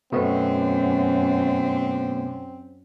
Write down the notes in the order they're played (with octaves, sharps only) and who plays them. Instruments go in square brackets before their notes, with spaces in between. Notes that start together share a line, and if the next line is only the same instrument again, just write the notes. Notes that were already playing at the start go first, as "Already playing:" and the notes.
[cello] F#2 [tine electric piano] B2 A3 B3 [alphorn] C4